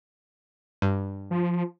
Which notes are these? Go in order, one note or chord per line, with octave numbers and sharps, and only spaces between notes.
G2
F3